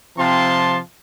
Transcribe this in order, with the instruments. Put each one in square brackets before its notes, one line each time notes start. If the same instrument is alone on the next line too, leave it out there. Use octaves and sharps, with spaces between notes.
[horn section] C3 F3 C4 F4 A5 C6